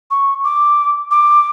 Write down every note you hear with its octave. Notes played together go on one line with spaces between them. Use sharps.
C#6
D6
D6